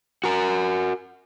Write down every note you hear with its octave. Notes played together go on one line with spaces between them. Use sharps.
F#4 A#4